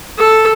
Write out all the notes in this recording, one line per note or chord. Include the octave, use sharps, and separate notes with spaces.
A4